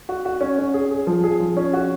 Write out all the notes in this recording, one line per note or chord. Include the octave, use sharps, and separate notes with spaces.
F#4
F#4
C#4
C#4
G#4
G#4
F3
G#4
F3
C#4
F#4